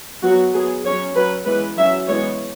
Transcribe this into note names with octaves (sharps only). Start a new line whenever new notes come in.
F#3 B3 F#4
F#3 B3 G#4
F#3 C#4 C#5
F#3 C#4 B4
E3 G#3 B3 B4
F#3 C#4 E5
E3 G#3 B3 C#5